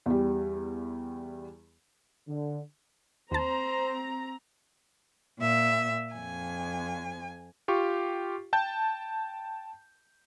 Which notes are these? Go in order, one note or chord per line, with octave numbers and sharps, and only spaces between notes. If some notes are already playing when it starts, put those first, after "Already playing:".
E2 G3
D3
D#2 C4 C5 A5 A#5
A#2 E5
F2 G#5
F4 G4 C#6
G5 A5 G6